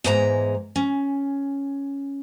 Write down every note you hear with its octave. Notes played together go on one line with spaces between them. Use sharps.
E2 G#2 G#3 A5 A#5
C#4